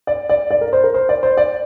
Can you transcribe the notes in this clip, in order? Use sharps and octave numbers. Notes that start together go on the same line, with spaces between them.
D5
D5
D5
A#4
C5
A#4
C5
D5
C5
D5